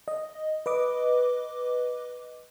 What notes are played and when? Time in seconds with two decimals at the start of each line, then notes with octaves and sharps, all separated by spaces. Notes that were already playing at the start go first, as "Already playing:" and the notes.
0.08 D#5
0.66 B4 D#5 D6